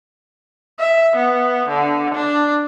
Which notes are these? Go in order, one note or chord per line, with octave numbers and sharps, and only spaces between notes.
E5
B3
D3
D4